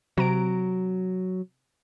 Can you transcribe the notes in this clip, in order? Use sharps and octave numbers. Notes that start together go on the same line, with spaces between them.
C3 F#3 A#5 D7